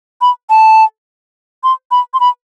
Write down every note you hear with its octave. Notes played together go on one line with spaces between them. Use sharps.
B5
A5
C6
B5
C6
B5